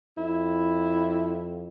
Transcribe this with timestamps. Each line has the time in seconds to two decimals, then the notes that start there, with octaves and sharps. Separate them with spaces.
0.17 F2 E4